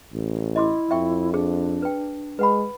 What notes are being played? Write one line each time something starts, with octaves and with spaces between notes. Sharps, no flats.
A1
E4 D#5 C6 D6
F2 E5 G5 C#6
D4 G#4
B4 G5
G#3 B4 F#5 B5